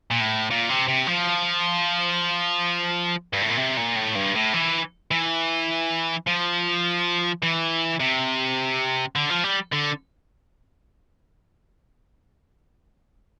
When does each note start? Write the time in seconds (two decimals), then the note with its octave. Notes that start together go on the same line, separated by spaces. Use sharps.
0.11 A#2
0.21 A2
0.50 A#2
0.69 C3
0.88 C3
1.07 F3
3.33 G2
3.42 A2
3.50 A#2
3.57 C3
3.77 A#2
3.96 A2
4.15 G2
4.35 A2
4.54 E3
5.11 E3
6.27 F3
7.43 E3
8.00 C3
9.15 D3
9.30 F3
9.44 G3
9.73 D3